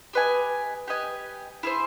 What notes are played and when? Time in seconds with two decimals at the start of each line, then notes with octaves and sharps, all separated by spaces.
0.13 G4 B4 D#5 G#5
0.88 G4 B4 D#5 G#5
1.63 E4 G#4 C5